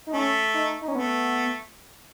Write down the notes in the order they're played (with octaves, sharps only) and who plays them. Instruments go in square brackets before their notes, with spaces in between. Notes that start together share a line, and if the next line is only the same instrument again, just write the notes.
[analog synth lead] D#4
[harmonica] A3 [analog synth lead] C#4
[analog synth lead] D#4
D#4
C#4
[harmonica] A3 [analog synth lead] B3